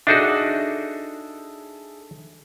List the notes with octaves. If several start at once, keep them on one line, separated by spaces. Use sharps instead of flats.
D4 D#4 F#4 G#4 A4 E5